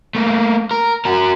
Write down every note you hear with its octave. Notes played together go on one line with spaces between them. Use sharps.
A3 A#3
A#4
F#4 A#4